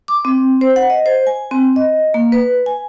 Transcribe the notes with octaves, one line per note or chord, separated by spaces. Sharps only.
D6
C4
C5
F#5
D#5
C5
G#5
C4
D#5
A#3
B4
G#5